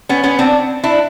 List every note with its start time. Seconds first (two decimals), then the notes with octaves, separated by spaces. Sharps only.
0.09 B3 C#4
0.23 B3 C#4
0.39 C4 D4
0.84 D4 E4